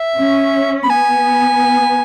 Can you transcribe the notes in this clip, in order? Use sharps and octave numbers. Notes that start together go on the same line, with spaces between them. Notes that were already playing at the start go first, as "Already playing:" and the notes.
Already playing: E5
C#4
B5
B3 G#5